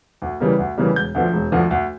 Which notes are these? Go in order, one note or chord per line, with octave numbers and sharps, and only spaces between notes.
D2
C#3 E3 G3 A#3
D2
C#3 E3 G3 A#3
E1 G6
D2 D3 F3
E1
D2 D3 F3
D2